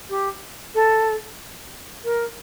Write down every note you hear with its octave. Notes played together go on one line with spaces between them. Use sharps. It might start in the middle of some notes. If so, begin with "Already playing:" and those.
G4
A4
A#4